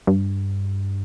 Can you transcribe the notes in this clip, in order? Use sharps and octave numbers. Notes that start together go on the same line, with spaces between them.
G2